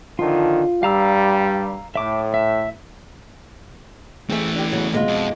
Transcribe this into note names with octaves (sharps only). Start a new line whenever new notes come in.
D3 D#3 F3 F4
G2 G3 F5 A#5 E6
A2 E5 D6
E5
E3 A3 C4 G#4 E5
D3 G4
E2 C#3 F#3
B2 G#3 F4
F2